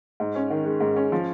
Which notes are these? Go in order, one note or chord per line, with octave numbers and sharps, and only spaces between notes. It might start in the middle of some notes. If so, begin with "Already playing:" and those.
G#2
C#4
D#3
G#3
G#2
C#4
F3